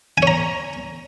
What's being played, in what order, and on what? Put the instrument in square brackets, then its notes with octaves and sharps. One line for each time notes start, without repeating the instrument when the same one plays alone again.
[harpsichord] G#5
C#5
A#5